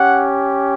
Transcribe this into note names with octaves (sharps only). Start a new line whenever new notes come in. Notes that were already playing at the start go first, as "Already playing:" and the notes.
Already playing: C#4 G4 F#5